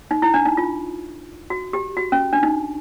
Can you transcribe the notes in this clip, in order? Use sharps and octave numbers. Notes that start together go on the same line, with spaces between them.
D#4
E4
D4
D#4
F4
F#4
G4
F#4
C#4
D4
D#4